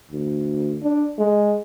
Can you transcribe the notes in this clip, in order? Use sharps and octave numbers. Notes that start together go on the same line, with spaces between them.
D2
D4
G#3